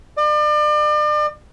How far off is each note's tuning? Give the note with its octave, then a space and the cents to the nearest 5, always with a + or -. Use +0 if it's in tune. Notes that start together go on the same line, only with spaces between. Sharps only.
D5 +40